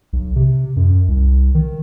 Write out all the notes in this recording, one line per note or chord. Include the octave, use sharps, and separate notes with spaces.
B1
C3
F#2
C2
D#3